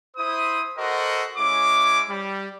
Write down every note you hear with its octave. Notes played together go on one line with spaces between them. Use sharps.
E4 C5 D#6
F#4 A4 A#4 C5 D#5 F#5
G#3 C#4 E4 D6
G3